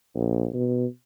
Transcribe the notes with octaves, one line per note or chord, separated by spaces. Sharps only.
A#1
B2